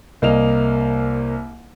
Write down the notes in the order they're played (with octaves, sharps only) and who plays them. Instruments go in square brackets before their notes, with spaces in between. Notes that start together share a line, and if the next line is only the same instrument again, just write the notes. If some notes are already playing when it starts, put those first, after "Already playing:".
[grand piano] C2 A#3 D#5 F7